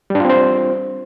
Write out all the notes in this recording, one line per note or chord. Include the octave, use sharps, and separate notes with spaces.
G3 C4 D4 F4 C5